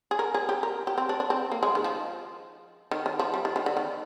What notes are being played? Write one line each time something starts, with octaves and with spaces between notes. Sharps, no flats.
G#4
A#4
G#4
G4
A#4
G4
C4
D4
D4
C4
A#3
G#3
D#3
F3
D#3
D#3
F3
G3
D#3
D#3
D3
D#3